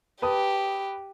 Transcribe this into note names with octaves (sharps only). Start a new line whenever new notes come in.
G4 B4 A5 D#6